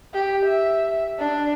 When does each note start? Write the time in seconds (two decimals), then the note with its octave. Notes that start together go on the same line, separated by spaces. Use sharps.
0.13 G4
0.46 E5
1.19 D4